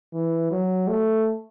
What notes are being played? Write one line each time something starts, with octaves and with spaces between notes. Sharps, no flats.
E3
F#3
A3